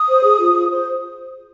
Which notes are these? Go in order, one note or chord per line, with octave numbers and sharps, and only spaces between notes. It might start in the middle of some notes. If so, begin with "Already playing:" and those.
Already playing: D#6
C5
G#4
F4
F4
C5